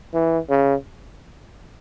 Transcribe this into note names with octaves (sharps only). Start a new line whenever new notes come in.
E3
C#3